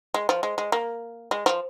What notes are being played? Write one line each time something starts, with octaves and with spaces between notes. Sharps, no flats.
G#3
F3
G#3
G#3
A#3
G#3
F3